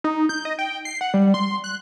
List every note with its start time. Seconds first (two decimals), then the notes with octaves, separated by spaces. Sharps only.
0.04 D#4
0.29 G6
0.45 D#5
0.59 G5
0.85 C7
1.01 F#5
1.14 G3
1.34 C6
1.64 F#6